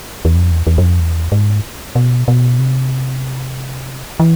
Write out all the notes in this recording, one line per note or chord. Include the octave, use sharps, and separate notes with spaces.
E2
F2
E2
E2
F#2
F2
E2
G#2
B2
B2
C3
E3